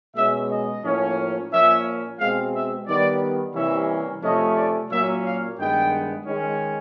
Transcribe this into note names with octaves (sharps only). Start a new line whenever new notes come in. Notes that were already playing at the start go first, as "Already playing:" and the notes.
B2 G#3 C#4 E5
D#5
A2 F3 A#3 C#4
A#2 F3 A#3 C#4 E5
B2 G#3 C4 F5
E5
D#3 G3 B3 D5
C3 E3 G3 A#3 C#4 E5
C3 F3 A3 C#4 D#5
D5
A#2 F#3 A#3 C#4 E5
F5
G2 D#3 G#3 B3 G5
D#3 G#3 C#4